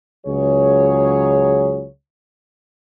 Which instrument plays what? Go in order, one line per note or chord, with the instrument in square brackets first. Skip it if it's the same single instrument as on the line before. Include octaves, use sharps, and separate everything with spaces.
[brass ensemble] C#2 F#3 G#4 C#5